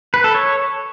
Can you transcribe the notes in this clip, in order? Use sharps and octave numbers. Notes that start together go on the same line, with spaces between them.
B4
A4
C#5